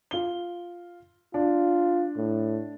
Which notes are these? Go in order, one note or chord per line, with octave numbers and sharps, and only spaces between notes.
F4 G7
D4 F4
A2